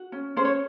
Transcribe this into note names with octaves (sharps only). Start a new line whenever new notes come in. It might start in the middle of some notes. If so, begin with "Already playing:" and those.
Already playing: F#4
C#4
C#4 C5
C#5